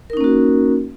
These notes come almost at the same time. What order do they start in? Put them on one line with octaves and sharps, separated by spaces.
A#4 D#4 C#4 A#3 F#4